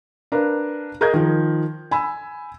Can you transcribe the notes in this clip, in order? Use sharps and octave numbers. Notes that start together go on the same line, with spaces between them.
D4 A#4 B4 F5
G#4 A#4 D#5 A#5 G6 G#6
D#3 F3
G#5 B5 E6